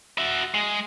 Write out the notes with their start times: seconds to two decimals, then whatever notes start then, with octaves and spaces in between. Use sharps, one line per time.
0.18 F#4 E5
0.54 G#3